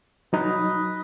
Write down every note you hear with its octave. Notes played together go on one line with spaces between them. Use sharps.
F#3 D#4 B4 D#5